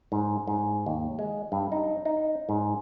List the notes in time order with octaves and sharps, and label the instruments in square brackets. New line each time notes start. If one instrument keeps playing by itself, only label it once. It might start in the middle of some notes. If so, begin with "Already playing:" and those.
[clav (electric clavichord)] G#2
G#2
D#2
G#3
G2
D#4
D#4
G#2